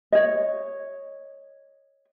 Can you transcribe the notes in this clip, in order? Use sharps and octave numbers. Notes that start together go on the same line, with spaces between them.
C#5 D#5